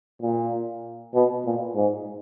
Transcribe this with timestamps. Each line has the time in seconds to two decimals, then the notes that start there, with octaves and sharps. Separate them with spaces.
0.22 A#2
1.14 B2
1.45 A#2
1.75 G#2